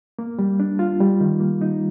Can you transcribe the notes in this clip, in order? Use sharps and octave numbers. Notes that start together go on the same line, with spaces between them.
A#3
G3
D4
F4
G3
D#3
A#3
D#4